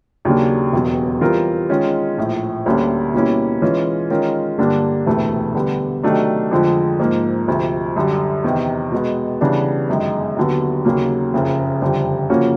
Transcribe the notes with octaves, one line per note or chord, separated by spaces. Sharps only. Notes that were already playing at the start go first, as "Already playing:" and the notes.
D#2 C#3 F#3 A#3 D4
E1 E2 B2 F#3
E3 G3 C4 F4 A#4
D#3 G#3 C#4 F4
A#1 A2 F3
D2 D3 G3 A#3 C#4
B2 G3 A#3 C#4 E4
E3 G#3 C#4 F4
D#3 G#3 C#4 F4 A#4
G2 D3 G3 A#3 D4
E1 D2 C3 E3 A3
D3 G3 B3
C3 D#3 F#3 A3 D4
F2 D3 F3 G#3
G#2 F3 A#3
D2 C3 F3
F#2 D3 G3
E2 C3 D#3
B2 G#3 B3
C#3 E3 G3 B3 D4
G1 F#2 D#3 G#3
D#2 D3 F#3 B3
D#2 C#3 F#3 A#3
F#1 F2 C#3
F#1 F2 D3 G3
C#3 F3 A#3 C#4 F#4